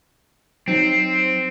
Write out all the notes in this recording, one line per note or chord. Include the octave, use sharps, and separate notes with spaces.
F#3 C4 D#4